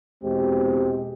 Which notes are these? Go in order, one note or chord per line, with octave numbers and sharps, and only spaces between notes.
E2 B2 G#3 C4 G4